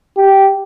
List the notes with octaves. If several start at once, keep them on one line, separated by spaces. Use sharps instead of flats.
G4